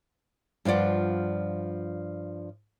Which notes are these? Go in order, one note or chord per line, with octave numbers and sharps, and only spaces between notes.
G2 F3 F4 D5 F#5